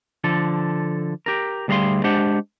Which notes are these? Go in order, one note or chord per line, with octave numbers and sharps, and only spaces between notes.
D3 F3 A4
G4 A#4
D2 G3 G#4 A#4 F5 C6
G#3 D4 G4 C5 F#5